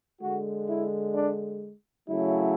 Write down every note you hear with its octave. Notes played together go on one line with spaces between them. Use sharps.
D3 G#3 F#4
E4
D4
C#3 F#3 A3 E4